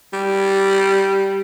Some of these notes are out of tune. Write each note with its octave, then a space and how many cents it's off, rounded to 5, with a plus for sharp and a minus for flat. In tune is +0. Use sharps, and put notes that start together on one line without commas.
G3 -5